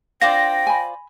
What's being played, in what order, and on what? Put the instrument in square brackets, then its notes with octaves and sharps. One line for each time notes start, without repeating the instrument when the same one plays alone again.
[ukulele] D4 F5 [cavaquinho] F4 C5 D5 [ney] G5 [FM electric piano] A#6
[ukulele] G#5 B5